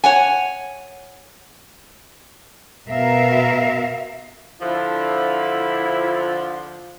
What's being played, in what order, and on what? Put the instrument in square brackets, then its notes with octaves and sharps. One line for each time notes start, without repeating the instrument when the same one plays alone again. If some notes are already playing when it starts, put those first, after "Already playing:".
[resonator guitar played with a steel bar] C#5 F#5 G#5
[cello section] B2 B3 A#4 E5 F5
[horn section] D3 F3 [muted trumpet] E4